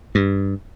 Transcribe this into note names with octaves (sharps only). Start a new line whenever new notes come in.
G2